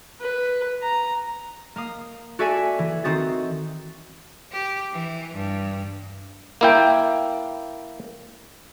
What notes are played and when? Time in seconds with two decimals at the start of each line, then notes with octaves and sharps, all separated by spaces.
0.20 B4
0.82 A#5
1.76 A#3 F5 D#6
2.39 F#4 A4 D5 E5 G#5
2.79 E3
3.04 D#3 C4 F#4 D#6 A6
4.52 G4
4.92 E3
5.34 G2
6.61 A#3 E4 G5